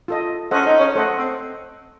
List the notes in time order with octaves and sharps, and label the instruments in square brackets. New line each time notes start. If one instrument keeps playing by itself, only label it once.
[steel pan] F4 A4 D#5
[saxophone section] C#4 [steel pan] A4 C5 D#5 F#5
[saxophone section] D#4
C#4
[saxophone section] A3 [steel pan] A4 C5 D#5 F#5
[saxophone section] C4